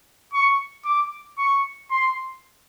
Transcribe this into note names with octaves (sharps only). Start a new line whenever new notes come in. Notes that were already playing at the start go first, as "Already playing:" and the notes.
C#6
D6
C#6
C6